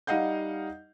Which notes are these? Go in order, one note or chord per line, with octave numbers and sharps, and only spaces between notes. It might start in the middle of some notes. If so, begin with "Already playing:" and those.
G3 D#4 D#5 F5 F#5 G6